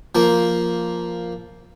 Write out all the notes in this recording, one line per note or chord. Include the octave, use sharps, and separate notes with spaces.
F3 A#3